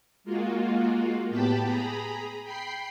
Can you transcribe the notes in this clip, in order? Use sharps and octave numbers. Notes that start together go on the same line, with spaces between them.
G#3 A#3 F4 F#4
A2 B3 G4 G5 A5 B5
G#4 A#5 B5
G5 B5 C7